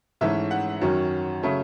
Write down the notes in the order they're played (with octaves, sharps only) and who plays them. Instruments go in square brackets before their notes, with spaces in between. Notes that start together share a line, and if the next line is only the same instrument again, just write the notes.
[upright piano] G#2 E3 A3 C#4 E5
F#5
F#2 D#3 F#3 C#4
C#3 F#3 A3 C#4